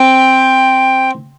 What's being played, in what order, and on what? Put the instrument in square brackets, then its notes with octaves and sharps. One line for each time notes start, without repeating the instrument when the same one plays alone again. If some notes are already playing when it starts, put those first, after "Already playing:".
Already playing: [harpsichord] C4 [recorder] G5